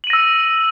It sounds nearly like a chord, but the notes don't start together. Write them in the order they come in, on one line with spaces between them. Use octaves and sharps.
F#7 D#7 A#6 E6